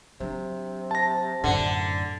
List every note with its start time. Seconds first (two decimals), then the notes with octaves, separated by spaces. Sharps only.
0.20 C3 F#3 D4
0.91 A5 A#6
1.44 F#2 A2 D3